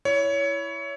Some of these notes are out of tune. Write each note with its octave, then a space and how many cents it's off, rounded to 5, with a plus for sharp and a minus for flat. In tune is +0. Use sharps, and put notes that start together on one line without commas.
E4 +0 C#5 +20